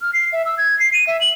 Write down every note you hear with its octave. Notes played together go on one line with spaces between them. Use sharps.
F6
C7
E5
E6
G#6
C7
D#7
E5
F#7